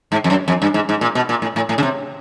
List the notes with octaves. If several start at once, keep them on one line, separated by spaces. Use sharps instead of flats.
G#2
F2
F#2
F2
G2
G#2
G#2
A#2
B2
A#2
A2
A2
A2
C#3
C3